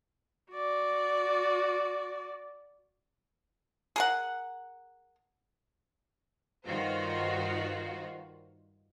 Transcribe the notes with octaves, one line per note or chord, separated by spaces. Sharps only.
F#4 D5
G#4 A#4 F#5
G2 D#3 F4 F#4 C5